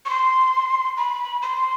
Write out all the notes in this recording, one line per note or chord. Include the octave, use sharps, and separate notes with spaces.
C#6
C6
B5
C6